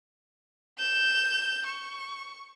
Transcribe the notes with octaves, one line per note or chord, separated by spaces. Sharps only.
G6 E7
C#6